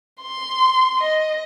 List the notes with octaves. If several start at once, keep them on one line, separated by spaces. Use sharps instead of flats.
C6
D#5